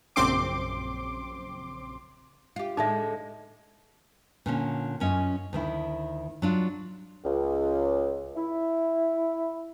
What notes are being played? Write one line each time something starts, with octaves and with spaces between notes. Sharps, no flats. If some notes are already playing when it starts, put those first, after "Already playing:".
A#1 F#2 C#3 C4 C6 D6
F4 G4
A2 D3 G#3 D#4 E5
A#2 D3 C#4
F#2 C#4 F4 D#5
D2 D#3 E4
F#3 D4 F4
C#2
E4